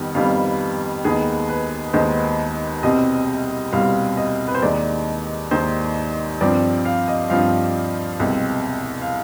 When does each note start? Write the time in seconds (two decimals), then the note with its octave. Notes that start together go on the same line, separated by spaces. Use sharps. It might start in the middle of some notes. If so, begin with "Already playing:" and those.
Already playing: F2 D#3 G3 B3
0.15 F2 D#3 G3 B3 F5
1.04 D#2 D#3 G#3 B3 G#4
1.49 B4
1.93 D#2 D#3 G#3 B3 C5
2.83 C2 B2 G3 C4 D#5
3.72 C2 B2 G3 C4 F5
4.17 D#5
4.48 B4
4.55 C5
4.62 D#2 D#3 G#3 D5
5.51 D#2 D#3 G#3 C5
6.40 G2 F3 C4 D5
6.85 F5
7.08 D#5
7.30 G2 F3 C4 F5
8.20 C2 B2 G#3 C4
9.01 F5